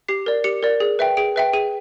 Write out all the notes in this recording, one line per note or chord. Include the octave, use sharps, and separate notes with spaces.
G4 C7
A#4 D5
G4 C#7
A#4 D5
G#4
B4 E5 G5
G#4 D7
B4 E5 G5
G#4 D#7